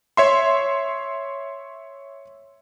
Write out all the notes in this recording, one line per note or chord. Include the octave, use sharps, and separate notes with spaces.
C#5 E5 C6